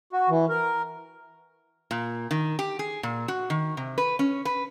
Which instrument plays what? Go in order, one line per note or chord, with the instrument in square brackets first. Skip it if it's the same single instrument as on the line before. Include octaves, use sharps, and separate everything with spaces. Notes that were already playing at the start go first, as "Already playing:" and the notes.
[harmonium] F#4
E3
A#4
[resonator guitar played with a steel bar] A#2
D#3
G4
G#4
A#2
F#4
D#3
C3
B4
C#4
B4